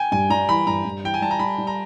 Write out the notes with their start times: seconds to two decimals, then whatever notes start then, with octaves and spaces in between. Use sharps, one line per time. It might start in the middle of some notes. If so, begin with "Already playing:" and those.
Already playing: G5 G#5
0.12 G2 G#5
0.30 G3 A#5
0.49 E3 B5
0.67 G2 A#5
0.85 G2
1.04 E3 G5
1.14 G#5
1.21 G3 A5
1.31 A#5
1.39 G3 B5
1.58 G3
1.67 A#5